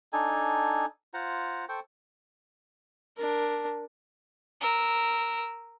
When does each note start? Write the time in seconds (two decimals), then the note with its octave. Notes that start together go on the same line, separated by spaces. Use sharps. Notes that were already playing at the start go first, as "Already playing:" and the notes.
0.13 D4 D#4 A4 G#5
1.14 F4 C5 F#5 A#5
1.69 A4 C5 G5 C#6
3.16 D4 A#4
4.61 A#4 E6